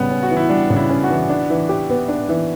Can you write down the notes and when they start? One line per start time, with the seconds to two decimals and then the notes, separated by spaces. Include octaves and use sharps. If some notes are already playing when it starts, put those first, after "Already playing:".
Already playing: C#3 G3 B3
0.11 C#4
0.23 F#4
0.31 E3
0.36 E4
0.49 G3 D4
0.70 C#3
0.76 E4
0.89 C#4
1.03 F#4
1.09 E3
1.29 D4
1.50 E3
1.69 G4
1.89 B3
2.08 D4
2.29 E3